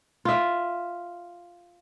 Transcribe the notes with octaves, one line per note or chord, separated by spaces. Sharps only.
F4 E5